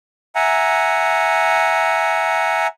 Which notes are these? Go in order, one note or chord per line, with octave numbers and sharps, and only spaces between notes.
E5 F#5 G#5 A#5